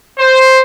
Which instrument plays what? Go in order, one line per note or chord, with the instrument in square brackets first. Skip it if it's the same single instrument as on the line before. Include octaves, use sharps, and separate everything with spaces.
[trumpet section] C5